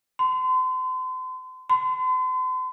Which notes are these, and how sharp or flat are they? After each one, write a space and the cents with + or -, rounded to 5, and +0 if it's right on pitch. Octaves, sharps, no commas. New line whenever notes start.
C6 -40
C6 -45